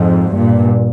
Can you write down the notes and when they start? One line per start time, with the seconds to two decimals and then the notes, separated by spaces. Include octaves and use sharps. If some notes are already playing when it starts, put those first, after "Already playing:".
Already playing: F2 G#2
0.37 G2 A#2